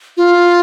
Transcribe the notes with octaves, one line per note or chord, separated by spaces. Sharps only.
F4